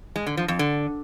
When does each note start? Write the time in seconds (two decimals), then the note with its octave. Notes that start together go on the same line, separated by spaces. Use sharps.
0.16 G#3
0.27 D3
0.37 F3
0.48 F2
0.59 D3